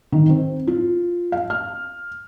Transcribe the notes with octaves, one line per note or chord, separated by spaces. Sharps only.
D#3
C4
F4
F5
F6